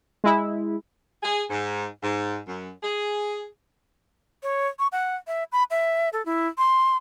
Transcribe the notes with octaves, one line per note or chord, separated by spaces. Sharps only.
G#3 E4
G#4
G#2
G#2
F#2
G#4
C#5
C#6
F#5
E5
B5
E5
A4
E4
C6